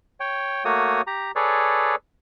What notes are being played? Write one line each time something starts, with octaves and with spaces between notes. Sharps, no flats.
C#5 G5
A3 A#3 F#4 C#5 D#6
G4 A#5
G#4 A4 B4 C#5 D5